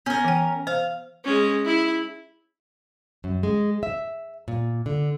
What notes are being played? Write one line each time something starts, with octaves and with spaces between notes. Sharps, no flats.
B3 C#4 A#4
E3 G5
C5 F5
G#3 C#4
E4
F#2
G#3
E5
A#2
D3